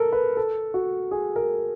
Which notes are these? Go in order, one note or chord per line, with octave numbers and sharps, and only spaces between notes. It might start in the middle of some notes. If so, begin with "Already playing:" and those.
Already playing: A4 A#4
B4
A4
F#4
G#4
A#4